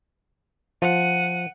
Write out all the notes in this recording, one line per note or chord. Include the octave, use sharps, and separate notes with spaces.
F3 F#5 D#7